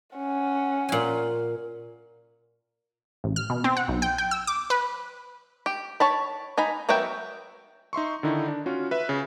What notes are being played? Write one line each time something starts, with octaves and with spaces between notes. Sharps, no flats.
C#4 F#5
A#2 G#5
A1
F6
B2
C4
F#5
B1
G5
G5
E6
D6
B4
G4
C#5 A5 B5
D#4 G#5 A#5 B5
F#3 B3 A#4 E5 G5
D#4 E5 C6 C#6
D3 D#3 D#4 E4
D4
C#4 F4 F#4
B4 E5
C#3 G#5